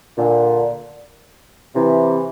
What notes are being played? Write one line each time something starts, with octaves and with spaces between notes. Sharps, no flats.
A#2 D3
C3 E3